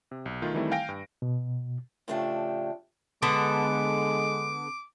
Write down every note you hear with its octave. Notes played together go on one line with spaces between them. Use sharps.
C3
B1
D#3 A3 F4
D#3 E3 G3 A3 C4 E4
F5 G5 G#5 A#6 D7
G2
B2
A2 C#3 F3 A3 D4 G4
D3 G#3 B3 A4 D6